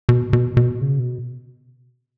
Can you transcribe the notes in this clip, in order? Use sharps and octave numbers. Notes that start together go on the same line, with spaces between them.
B2
B2
B2
C#3
B2